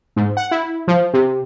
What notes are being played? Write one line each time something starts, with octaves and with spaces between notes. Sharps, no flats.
G#2
F#5
E4
F3
C3